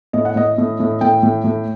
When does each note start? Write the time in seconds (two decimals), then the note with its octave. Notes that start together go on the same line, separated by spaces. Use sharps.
0.13 A2 D#5
0.25 F#5
0.36 A2 D#5
0.58 A2
0.80 A2
1.01 A2 G5
1.23 A2
1.44 A2